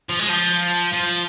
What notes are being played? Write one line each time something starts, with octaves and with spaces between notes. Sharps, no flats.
F3
G#3
F3
F3